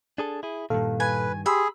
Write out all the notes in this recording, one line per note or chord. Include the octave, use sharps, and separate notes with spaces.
D4 G#4 A4
E4 G#4
G2 A#2 D#3 A4 F5
B4 G#5
G4 G#4 B5 C6 E6